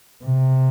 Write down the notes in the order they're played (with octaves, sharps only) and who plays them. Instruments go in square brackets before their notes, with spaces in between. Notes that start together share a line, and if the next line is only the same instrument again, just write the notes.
[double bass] C3